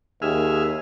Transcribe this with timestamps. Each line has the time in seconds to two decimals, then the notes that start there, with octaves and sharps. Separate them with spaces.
0.22 D#2 G#4 E5 F6